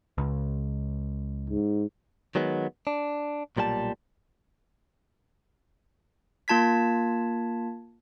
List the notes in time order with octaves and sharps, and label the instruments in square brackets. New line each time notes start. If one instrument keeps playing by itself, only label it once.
[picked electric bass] C#2
[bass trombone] G#2
[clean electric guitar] D#3 F#3 G#3 B3
D4
B1 A#2 G3 A4 A5
[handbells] A#3 F4 A5 G#6 B6